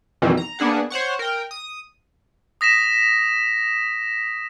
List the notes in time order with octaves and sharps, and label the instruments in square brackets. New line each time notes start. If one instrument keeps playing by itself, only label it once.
[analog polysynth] F2 B2 D#3 E3 G3
A#5
A#3 B3 D4 G#4 F#5
C5 C#5 F#5 C#6
A#4 G5
D#6
[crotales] D#6 A#6 B6 E7